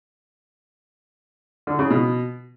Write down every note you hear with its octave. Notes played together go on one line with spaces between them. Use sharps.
D3
C#3
B2